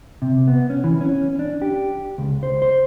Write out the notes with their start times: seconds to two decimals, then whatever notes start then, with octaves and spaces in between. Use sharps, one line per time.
0.22 C3
0.47 B3
0.70 C#4
0.84 E3
1.01 C#4
1.39 D4
1.62 G4
2.18 C#2
2.43 C5
2.62 C5